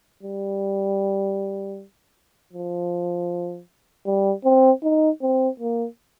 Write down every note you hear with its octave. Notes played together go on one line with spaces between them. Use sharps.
G3
F3
G3
C4
D#4
C4
A#3